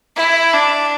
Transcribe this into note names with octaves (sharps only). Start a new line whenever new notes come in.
E4
D4